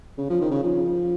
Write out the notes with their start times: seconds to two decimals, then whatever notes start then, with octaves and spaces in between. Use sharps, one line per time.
0.18 C#3
0.30 F3
0.41 D#3
0.51 C#3
0.63 F3